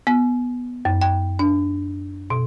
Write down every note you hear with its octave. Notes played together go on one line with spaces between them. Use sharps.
B3
F#2
G5
D4
B2